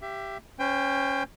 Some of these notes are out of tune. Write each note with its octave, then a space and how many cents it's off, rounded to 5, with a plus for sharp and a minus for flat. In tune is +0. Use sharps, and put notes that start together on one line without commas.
G4 +0 E5 +30
C#4 +0 C5 -35 G5 +20